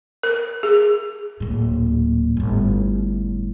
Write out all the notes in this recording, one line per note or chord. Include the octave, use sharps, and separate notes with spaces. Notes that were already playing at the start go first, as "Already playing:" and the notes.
A#4
G#4
D1 A#2
G1 A2